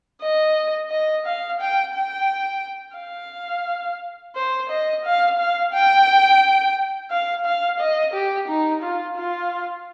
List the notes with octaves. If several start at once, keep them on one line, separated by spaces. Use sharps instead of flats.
D#5
D#5
F5
G5
G5
F5
C5
D#5
F5
F5
G5
F5
F5
D#5
G4
D#4
F4
F4